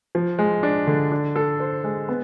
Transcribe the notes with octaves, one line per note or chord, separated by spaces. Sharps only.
F3
G#3
D4
D3
D4
A4
C5
G#3
B3